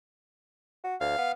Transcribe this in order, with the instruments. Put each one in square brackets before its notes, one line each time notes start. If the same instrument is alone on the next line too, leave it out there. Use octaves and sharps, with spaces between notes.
[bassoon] F#4
[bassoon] D2 [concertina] F5
[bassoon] B3